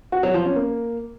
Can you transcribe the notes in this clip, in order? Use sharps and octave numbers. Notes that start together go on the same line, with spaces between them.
F#4
F#3
F3
C#4
A#3